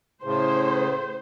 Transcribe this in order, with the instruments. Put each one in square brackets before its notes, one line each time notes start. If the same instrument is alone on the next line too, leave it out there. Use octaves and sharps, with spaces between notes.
[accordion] A2 C#3 [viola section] C5